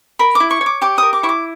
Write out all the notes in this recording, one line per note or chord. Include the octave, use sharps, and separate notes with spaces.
A#4 B5
E4 D6
C#6
C#5
D6
G4 D6
A#4 D#6
D6
E4 C#6
D6